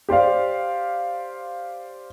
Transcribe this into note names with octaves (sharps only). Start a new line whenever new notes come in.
G4 C5 D5 F5